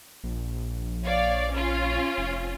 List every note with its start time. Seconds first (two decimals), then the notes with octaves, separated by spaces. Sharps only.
0.24 A#1
1.05 C#5 D5 F5
1.51 C#4 F4
2.18 F1